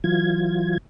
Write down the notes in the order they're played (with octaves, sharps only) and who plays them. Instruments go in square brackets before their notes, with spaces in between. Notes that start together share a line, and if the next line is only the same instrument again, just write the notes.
[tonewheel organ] E3 F#3 F4 G#6